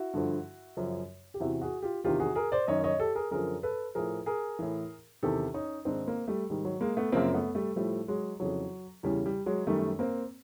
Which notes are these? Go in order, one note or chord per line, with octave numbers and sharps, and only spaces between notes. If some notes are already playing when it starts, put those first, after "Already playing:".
Already playing: E4 F#4
G2 D3 F3
F#2 C#3 F3
G4
E2 C3 E3 E4 F#4
F#4 G#4
F4 G4
E2 C3 D#3 F4 G4
F#4 G#4
G#4 A#4
C5 D5
F#2 D#3 C#5 D#5
C#5 D#5
G4 A4
G#4 A#4
F#2 D3 F3 G#4 A#4
A4 B4
A2 F3 G#4 A#4
G#4 A#4
A2 E3
E2 C3 D#3 G4 A4
C#4 D#4
G#2 D#3 C4 D4
A#3 C4
G3 A3
G#2 D#3 G3
F#3
G#3 A#3
A3 B3
F#2 C#3 F3 A#3 C4
A3 B3
G3 A3
A2 F3 G3 A3
F#3 G#3
F2 C#3 E3 F#3
E2 C#3 E3 G3
G3
F#3 G#3
F#2 D#3 G3 A3
A#3 C4